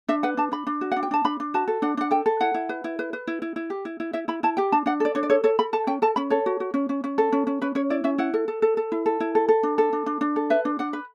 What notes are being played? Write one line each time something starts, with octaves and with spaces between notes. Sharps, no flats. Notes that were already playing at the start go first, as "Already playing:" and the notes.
D4 E5
B4 F#5
D4 A5
D4 B5
D4
F#4
D4 F#5
G5
D4 A5
D4 B5
D4
F#4 A5
A4
D4 F#5
D4 F#5
A4 G5
A4
E4 F#5
E4
B4
E4
B4
B4
E4
E4
E4
G4
E4
E4
E4 E5
E4 B5
E4 A5
G4 G5
D4 A5
D4 F#5
A4 D5
D4 C#5
D5
A4 C#5
A4 C#5
A4 B5
A4 A5
C#4 G5
A4 A5
C#4 B5
A4 C#5
F#4
F#4
C#4
C#4
C#4
A4
C#4
C#4
C#4 B4
C#4 C#5
E4 D5
C#4 E5
E4 F#5
A4
A4
A4
A4
E4
A4
E4
A4
A4
D4
A4
D4
D4
D4
A4
B4 E5
D4
D4 F#5
B4